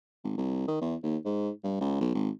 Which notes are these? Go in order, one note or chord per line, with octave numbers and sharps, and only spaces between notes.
G#1
C2
D#3
E2
D#2
G#2
G2
C#2
B1
G#1